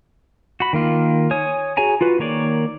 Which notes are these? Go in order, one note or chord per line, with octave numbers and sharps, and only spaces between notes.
F#4 B5
D#3 A#3 F4
C#5 G#5 D#6
F#4 G#4 C#5 G#5 A#5
F4 F#4 B4
D#3 A#3 C#5 D5